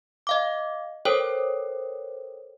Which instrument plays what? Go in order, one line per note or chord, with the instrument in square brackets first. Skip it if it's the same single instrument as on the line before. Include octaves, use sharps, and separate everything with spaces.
[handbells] D#5 F5 D6
A4 A#4 C5 C#5 G5